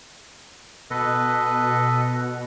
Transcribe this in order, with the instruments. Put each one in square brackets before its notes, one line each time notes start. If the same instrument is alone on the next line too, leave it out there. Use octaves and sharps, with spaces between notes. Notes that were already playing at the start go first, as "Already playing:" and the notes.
[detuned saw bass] B2 [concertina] A4 B4 D#5